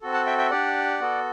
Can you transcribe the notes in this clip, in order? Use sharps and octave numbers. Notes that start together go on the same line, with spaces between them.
C4 F#4 A4
F#5 A5
E5 G5
E5 G5
D4 G4 D5 F#5
B3 F#4 A4